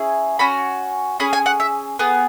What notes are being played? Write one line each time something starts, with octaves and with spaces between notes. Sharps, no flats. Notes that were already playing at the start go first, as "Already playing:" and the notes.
Already playing: C#4 E4 G#4
C#4 F#4 B5
C#4 G#4 B5
G#5
F#5
E5
B3 G#4